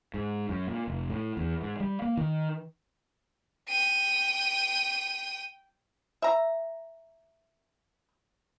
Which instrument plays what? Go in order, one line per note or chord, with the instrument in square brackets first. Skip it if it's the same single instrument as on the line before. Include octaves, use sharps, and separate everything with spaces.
[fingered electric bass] G#2
F#2
A#2
F1
A2
E2
G#2
G3
A#3
D#3
[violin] G5 D#7
[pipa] E5 A#5